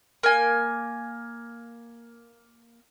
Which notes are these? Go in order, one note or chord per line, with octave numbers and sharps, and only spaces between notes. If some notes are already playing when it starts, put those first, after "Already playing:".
A#3 G#5